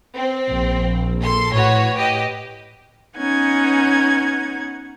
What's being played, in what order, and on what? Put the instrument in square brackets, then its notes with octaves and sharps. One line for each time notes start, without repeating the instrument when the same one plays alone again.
[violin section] C4
[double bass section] A#1
[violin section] A4 C6
[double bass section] A2 [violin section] F#4 B4 C#5
[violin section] G4 B4 D#5
[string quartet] B3 C#4 D#4 F#5 G#6